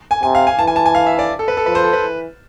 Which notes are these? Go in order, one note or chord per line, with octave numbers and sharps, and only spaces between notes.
G#5
C3 G#5
F5
G#5
E3 A5
G#5
A5
G#5
F5
E5
D5
A4
B4
A4
F3 B4
C5
A4
B4
E3